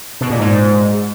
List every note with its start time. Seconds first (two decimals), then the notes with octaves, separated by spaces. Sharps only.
0.21 B2
0.30 A#2
0.39 G#2